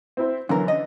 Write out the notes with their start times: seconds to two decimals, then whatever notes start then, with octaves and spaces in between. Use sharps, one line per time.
0.17 C4 E4 C5
0.49 F#2 D3 E3 A#4
0.68 D#5